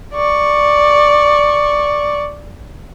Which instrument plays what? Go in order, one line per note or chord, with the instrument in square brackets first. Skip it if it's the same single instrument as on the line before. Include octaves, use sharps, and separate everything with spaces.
[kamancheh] D5 C#6